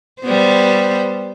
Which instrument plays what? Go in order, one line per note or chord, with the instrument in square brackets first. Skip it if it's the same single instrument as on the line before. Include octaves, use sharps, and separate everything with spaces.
[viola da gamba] G3 B3 C5